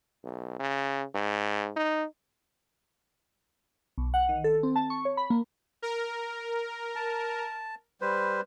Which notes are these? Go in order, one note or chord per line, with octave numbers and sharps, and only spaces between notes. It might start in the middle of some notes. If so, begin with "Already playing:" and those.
B1
C#3
G#2
D#4
B1
F#5
D#3
A4
C4
A5
C#6
C#5
B5
A#3
A#4
A5
G3 B4 C5